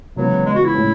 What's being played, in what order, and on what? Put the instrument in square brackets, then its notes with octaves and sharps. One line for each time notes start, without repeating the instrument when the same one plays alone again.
[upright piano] C#3 E3 G#3 B3 [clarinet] F#3
[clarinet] G#3
F#4
E4
[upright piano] A2 G#3 C#4